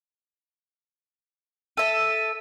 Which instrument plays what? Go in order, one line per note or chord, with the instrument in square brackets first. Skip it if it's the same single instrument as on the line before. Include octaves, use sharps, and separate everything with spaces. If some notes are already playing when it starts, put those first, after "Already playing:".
[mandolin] A4 E5 [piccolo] D#7